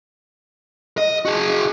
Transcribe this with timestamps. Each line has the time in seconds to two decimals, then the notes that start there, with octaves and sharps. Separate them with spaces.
0.98 D#5
1.25 F#4 G#4